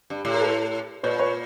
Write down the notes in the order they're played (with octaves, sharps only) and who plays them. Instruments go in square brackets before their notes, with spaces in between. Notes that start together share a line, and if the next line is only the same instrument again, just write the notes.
[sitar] G2
A2
[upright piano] A#4
A4 B4
[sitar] A#2 [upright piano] B4 C#5
[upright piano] B4 C#5